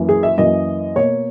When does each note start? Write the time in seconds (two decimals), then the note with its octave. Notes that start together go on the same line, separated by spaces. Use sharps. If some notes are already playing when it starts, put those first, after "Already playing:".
Already playing: F#2 E3 A#3
0.09 G#4
0.23 E5
0.38 F#2 E3 A#3 D#5
0.96 B2 A#3 C#5